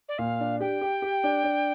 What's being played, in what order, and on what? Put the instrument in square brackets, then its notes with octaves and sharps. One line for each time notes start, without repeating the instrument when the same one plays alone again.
[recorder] D5
[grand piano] A#2 [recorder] F5
[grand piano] D4
[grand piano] G4 [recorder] G5
[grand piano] G4
G4
D4
D4